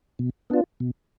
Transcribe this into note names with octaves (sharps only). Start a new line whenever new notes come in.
B2
B3 D4 F4
B2